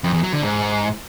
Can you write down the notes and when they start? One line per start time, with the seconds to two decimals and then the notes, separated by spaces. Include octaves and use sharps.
0.04 F2
0.13 E2
0.23 F#3
0.33 D3
0.42 G#2